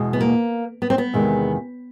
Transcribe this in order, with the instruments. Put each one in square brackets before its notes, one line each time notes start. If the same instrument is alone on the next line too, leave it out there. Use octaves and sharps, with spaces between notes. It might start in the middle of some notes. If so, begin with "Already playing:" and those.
Already playing: [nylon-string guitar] E2 B2 G#3
[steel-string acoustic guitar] B3
A#3
B3
C4
B3
[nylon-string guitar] E2 C3 D#3 G#3